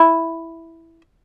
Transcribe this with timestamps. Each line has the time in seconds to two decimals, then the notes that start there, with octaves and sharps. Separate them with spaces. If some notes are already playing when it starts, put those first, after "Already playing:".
Already playing: E4